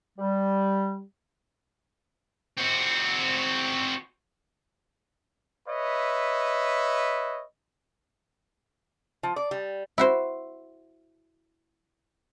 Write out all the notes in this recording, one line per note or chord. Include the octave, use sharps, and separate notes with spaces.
G3
C4 F#4
B4 C#5 D#5 E5
F3
D5
G3
E4 F#4 C5